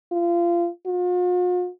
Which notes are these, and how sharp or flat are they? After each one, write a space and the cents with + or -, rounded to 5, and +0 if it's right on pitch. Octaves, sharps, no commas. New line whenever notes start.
F4 -25
F4 +45